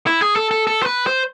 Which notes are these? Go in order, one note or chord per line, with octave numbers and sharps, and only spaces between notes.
E4
G#4
A4
A4
A4
C5
B4
C5